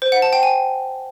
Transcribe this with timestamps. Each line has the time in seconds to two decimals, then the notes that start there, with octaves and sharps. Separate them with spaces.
0.02 C5
0.12 F#5
0.22 A5
0.33 G5
0.43 G#5